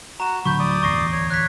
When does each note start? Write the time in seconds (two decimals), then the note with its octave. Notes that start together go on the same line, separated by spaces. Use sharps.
0.20 F#4 A#5 E7
0.45 D1 D3 F#3 B5 C#6 G6
0.59 D5 D#6
0.83 D1 G1 E2 C#6 A#6 C7
1.12 C#5
1.30 C#5 F#6 B6